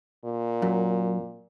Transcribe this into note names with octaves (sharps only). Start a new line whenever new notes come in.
A#2
F#2